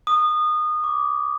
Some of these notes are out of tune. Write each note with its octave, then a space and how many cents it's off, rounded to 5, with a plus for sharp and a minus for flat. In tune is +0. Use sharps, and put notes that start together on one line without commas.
D#6 -25
D6 -20